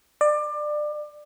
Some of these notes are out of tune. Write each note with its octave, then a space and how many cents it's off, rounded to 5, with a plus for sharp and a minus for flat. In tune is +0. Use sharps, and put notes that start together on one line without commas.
D5 +25